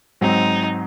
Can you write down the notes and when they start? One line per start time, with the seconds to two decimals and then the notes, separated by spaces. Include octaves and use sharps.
0.21 G#2 F#3 C4 D#4